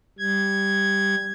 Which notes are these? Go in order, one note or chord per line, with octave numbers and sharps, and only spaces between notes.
G3 G#6